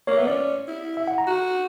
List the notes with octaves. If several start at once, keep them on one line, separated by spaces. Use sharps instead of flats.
A#3 C#5
B3 E5
C#4 D5
E4
E5
F#5
A#5
F#4